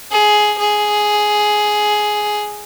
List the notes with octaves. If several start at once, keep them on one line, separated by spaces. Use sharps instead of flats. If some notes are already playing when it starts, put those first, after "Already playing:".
G#4
G#4